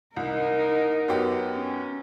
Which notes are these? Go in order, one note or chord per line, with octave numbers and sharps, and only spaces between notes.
C2 D#4 A#4
F#2 B3 G4
C#4